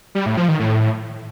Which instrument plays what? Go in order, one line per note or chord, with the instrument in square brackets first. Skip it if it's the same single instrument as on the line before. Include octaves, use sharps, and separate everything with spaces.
[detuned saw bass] G3
A2
F3
D#3
A2